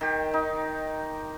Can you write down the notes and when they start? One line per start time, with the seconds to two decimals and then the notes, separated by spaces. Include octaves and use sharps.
0.01 D#3 G4
0.34 D#4